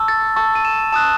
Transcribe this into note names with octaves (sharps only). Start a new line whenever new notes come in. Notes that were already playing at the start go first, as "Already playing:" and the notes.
Already playing: A5 C#6 E6
A6
A5 C#6 E6 A6
D#7
E7
A5 D#6 F#6 E7